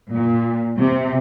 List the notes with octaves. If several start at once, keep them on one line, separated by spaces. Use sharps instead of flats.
A#2
C3